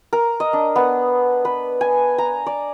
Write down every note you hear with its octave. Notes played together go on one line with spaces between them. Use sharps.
A#4
D#5
D4
B3
B4
G#5
A#5
D5